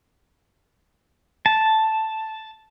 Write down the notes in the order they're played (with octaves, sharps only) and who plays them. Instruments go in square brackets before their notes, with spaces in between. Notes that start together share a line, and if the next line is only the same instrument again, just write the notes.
[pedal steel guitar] A5